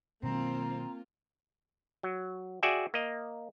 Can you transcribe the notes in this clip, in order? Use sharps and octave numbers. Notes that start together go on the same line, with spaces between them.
B2 D#3 F#3 A#3 C4 F4 A#5
F#3
F#4 G#4 D5 E5 G5 G#5
A#3 D#5